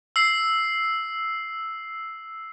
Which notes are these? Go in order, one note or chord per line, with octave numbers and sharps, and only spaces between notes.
E6 C7